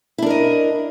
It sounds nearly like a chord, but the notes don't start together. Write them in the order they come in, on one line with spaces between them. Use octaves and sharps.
E4 D4 A#4 D#5